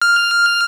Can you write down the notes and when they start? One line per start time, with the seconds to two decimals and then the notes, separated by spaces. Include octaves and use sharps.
0.02 F6